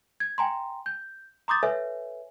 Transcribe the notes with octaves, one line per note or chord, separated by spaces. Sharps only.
G#6
G5 G#5 A#5 C6
G6
A#5 C6 D6 D#6 G6 A6
A4 B4 C#5 E5 G#5